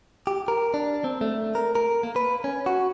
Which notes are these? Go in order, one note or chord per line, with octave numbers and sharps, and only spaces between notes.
G4
A#4
D4
C4
A3
A#4
A#4
A#3
B4
C#4
F#4